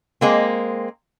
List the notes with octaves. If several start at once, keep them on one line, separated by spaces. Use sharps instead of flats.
G#3 A#3 C4